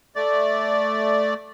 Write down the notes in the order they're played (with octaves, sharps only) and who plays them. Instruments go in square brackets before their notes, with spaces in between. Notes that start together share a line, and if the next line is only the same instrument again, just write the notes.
[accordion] A3 D5